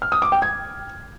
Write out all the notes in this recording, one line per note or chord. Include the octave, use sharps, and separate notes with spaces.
F6
D#6
D6
G5
G#6